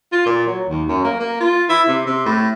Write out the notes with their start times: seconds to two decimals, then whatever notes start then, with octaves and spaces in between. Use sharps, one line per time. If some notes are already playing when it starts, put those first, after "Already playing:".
0.12 F4
0.26 A#2
0.47 F#3
0.69 D#2
0.88 F#2
1.04 A#3
1.20 A#3
1.40 F4
1.69 E4
1.88 C3
2.06 C3
2.25 A2